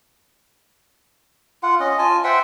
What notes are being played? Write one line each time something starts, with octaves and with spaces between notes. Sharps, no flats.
F4 F#5
C#4 D#5
F4 G#5 A5
C5 E5 F#5 G5